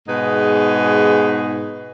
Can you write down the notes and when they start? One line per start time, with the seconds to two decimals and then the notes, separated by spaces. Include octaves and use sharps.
0.08 G#2 B2 D#4 G#4 B4